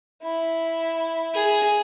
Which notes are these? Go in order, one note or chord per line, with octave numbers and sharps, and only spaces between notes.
E4
G#4